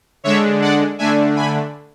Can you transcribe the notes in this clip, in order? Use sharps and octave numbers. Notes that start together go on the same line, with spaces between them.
D3 G#3 D4 C#5 E5
D5 F#5
D3 A3 D4 E5 G#5
G#5 B5